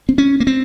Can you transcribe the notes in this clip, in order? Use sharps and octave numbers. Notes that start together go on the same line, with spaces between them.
C4
C#4
A#3
C4